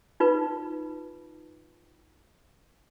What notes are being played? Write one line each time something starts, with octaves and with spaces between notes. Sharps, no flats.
D#4 F4 B4